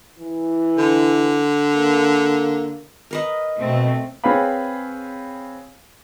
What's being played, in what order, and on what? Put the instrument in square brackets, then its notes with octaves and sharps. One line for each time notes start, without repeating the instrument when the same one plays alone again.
[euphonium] E3
[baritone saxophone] D3
[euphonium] A#3
[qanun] A#4 B4 D#5
[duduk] B2 [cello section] A3 C4
[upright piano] C4 G#4 B4 C#5 F5 B5